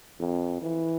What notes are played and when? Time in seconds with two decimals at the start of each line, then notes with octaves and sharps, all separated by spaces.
0.20 F2
0.62 E3